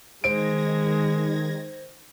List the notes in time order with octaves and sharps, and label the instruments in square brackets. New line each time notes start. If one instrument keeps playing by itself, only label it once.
[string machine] D#3 G#6 A#6 [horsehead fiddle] G#3 [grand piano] C5 D7